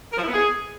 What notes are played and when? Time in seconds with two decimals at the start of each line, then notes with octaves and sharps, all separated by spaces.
0.11 A#4
0.17 F3
0.22 E4
0.27 B3
0.33 G#4